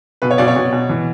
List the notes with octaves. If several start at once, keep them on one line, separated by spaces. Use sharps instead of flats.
B2 B4
C#5
B2 D5
C#5
B2
B2
E3